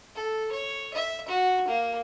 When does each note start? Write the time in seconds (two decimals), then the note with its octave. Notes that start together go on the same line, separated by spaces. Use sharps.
0.16 A4
0.52 C#5
0.94 E5
1.28 F#4
1.68 A#3